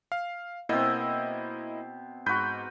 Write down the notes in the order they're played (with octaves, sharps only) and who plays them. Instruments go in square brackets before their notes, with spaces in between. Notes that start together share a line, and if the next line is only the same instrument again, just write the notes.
[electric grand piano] F5
[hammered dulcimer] B2 C4 [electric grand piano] A#3 E4 D#5
[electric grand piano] G#2 G6 [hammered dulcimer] F#4 B4